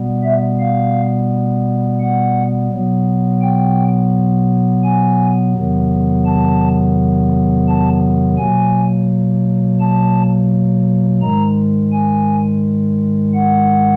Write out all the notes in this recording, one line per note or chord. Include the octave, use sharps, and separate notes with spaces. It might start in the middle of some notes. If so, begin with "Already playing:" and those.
Already playing: B2 G3 B3
E5
F5
F#5
B2 F#3 B3
G5
G#5
E2 C3 D#3 F#3 B3
A5
A5
B2 F#3 A#3 G#5
A5
G#2 D#3 G#3 A#5
G#5
F#5